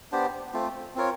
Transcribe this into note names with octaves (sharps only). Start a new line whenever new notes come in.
B3 D4 G4 C5
A3 C4 F4
C4 F4 A#4 C#5